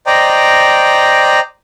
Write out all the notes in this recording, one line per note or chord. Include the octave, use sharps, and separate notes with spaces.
C5 D5 D#5 G5 A#5